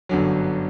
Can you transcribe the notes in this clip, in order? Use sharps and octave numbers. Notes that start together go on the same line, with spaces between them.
G1 F#2 D3 F#3